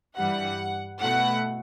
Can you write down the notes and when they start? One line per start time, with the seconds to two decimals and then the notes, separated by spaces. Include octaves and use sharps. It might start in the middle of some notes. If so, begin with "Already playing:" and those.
0.17 G2 E3 G3 F#5
1.02 B2 A3 E4 F#5